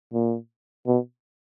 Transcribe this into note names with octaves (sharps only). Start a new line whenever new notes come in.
A#2
B2